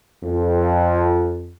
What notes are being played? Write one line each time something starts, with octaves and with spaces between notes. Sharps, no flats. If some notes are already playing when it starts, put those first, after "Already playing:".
F2